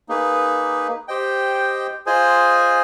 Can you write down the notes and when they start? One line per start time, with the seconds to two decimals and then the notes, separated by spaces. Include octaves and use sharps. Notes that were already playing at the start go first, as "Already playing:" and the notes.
0.09 A#3 D#4 G#4 B4
1.08 G4 C5 D#5 G5
2.06 F4 G#4 C5 D#5 G#5